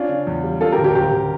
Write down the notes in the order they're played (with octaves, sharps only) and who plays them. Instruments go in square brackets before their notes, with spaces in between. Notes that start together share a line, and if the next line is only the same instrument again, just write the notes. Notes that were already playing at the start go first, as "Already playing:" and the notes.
Already playing: [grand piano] C#4 [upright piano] D4 F4
[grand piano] C#3
E2
G3
[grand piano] C#3 [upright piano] F4 A4
[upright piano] G4 A#4
[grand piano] D2
[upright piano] G4 A#4
[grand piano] D2 [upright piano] G4 A#4
[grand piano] D2